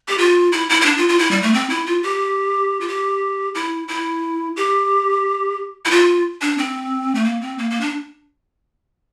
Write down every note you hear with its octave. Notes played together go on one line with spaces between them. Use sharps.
G4
F4
E4
E4
E4
D4
F4
F4
E4
G3
A3
C4
E4
F4
G4
F4
G4
E4
E4
G4
E4
F4
D4
C4
A3
A#3
C4
A#3
A#3
D4